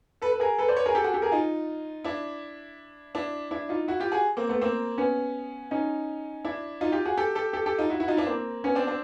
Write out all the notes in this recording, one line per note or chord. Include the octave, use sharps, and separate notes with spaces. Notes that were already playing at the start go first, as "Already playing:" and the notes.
A4 B4
B4
G#4 A#4
A4 B4
C5 D5
B4 C#5
G#4 A#4
G4 A4
F#4 G#4
G4 A4
G#4 A#4
D#4 F4
D4 E4
D4 E4
D4 E4
D#4 F4
E4 F#4
F4 G4
F#4 G#4
A#3 C4
A3 B3
A#3 C4
B3 C#4
C#4 D#4
D4 E4
D#4 F4
F4 G4
F#4 G#4
G4 A4
G4 A4
G4 A4
G4 A4
D#4 F4
E4 F#4
E4 F#4
D#4 F4
D4 E4
A#3 C4
B3 C#4
C4 D4
C4 D4